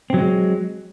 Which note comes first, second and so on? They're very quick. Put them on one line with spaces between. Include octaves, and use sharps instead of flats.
C4 F#3 G#3